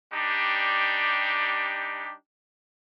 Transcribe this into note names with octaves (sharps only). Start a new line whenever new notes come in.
G3 D4 D#4 G4